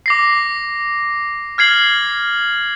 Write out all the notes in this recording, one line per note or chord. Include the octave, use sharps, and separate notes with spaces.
D6 A#6 C7
F6 G#6 C7 F#7